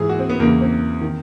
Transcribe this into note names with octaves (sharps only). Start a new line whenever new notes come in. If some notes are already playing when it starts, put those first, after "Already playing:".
Already playing: G#2 E3 G#4
F#4
C4
B3
E2 C#3 E3 A#3
C4
D#3